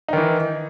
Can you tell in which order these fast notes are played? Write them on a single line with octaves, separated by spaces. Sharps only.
D#4 D#3 E3